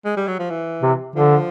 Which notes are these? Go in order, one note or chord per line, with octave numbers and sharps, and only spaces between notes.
G#3
G3
F#3
F3
E3
C3
D3 F3